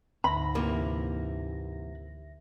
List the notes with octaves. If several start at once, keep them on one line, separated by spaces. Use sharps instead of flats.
D2 G#2 E5 B5 A#6
C3 E3 A#3